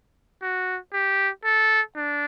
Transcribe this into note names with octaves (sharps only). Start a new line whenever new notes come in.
F#4
G4
A4
D4